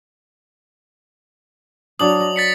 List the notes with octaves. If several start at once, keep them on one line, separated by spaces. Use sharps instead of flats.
F#3 D4 E4 D#6 F#7
D#5
A6 B6 C#7